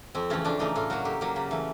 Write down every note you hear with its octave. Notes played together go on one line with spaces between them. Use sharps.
F2 C4
C#3 E3 A3 C#4
F2 D4
C#3 E3 A3 D#4
A2 F4
F#3 A#3 F#4
A2 G4
F#3 A#3
C#3
E3 A3